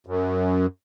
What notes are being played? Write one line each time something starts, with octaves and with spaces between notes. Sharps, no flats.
F#2